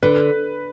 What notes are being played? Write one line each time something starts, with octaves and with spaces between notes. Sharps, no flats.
D3 B4